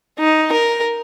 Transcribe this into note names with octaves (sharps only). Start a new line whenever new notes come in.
D#4
A#4